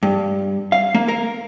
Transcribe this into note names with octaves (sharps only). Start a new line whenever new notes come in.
G2
F5
A#3
A#4